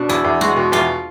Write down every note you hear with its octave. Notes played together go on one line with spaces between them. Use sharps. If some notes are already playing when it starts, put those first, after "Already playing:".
Already playing: B2 D4
E2 E4
E2
G#3 F#4
B2
E2 F4